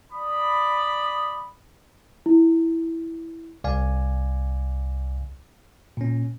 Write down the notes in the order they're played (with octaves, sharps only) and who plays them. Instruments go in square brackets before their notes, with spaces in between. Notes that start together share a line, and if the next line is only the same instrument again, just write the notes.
[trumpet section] D5 B5 D#6
[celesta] E4
[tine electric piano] C2 D5 F5 G#5
A#2 C#4